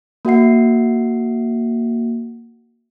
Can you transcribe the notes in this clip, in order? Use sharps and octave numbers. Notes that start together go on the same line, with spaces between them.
A#3 F#4 E5 F#5 C7